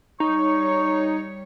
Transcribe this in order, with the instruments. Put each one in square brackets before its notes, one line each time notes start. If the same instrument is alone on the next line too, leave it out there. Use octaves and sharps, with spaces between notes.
[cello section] G3 C#5 [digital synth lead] D#4 [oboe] C#6